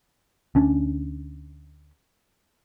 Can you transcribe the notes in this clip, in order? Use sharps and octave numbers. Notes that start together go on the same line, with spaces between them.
D2 C#4 D4